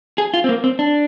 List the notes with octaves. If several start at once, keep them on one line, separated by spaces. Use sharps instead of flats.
G#4
F4
C4
A#3
C4
D4